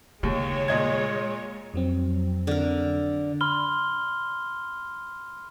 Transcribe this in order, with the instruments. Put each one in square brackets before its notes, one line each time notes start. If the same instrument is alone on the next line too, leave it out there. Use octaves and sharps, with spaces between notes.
[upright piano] D#2 [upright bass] C#3 A#3 [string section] G#3 C#5
[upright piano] A#2 D#5 G#6
[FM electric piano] F2 F#3 C4
[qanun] D3 A#4
[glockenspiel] B5 C6 F6 G7